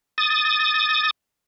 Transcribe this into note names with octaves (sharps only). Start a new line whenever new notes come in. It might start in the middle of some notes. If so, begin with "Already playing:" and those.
D#6 A6